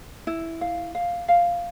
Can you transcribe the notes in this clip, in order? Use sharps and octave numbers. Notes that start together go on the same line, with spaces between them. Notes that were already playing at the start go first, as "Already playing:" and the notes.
E4
F5
F5
F5